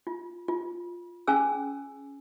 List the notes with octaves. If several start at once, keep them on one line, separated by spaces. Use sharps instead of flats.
F4
F4
C#4 G#4 G#5 E6